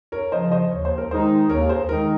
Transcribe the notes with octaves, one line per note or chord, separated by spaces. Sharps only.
A#4 C#5
C#3 F3 C5 D#5
C5 D#5
D#2 C#5
C5
A#4
D#3 G#3 D#4 G#4 C5
D#2 A#4 C#5
G#4 C5
D#3 G#3 D#4 A#4